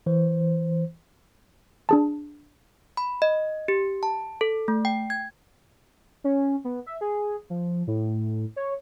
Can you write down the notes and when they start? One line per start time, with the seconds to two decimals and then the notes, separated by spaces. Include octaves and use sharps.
0.06 E3 C5
1.89 D4 G#4 A5
2.97 B5
3.22 D#5
3.68 G4
4.03 A5
4.41 A4
4.68 A3
4.85 G5
5.10 G#6
6.24 C#4
6.65 B3
6.86 E5
7.01 G#4
7.50 F3
7.87 A2
8.56 C#5